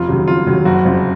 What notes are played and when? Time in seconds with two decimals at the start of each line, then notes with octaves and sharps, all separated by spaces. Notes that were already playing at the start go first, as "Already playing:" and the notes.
Already playing: F1 F4
0.08 D#2 C#3 F#3
0.27 F1 F4
0.47 D#2 C#3 F#3
0.65 F#1 F#4
0.85 F2 C#3 F3